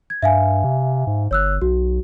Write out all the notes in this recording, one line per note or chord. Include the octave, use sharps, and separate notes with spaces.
G#6
G2 E5 F5 G#5
C3
G#2
G1 C#5 E6 F#6
B1 F#4